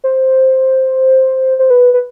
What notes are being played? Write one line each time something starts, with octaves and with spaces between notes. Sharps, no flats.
C5
C5
B4
B4